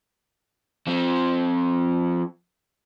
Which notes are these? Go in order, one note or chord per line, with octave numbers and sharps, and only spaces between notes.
F3 C4